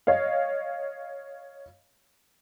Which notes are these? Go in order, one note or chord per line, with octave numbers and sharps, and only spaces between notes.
C#5 D#5 F5